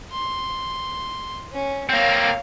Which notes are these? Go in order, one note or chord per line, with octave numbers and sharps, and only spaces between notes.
C6
C#4
A#3 C4 C#5 F5